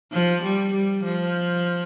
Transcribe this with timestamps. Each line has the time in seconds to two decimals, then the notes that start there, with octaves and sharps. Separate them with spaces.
0.13 F3
0.43 G3
0.74 G3
1.04 F3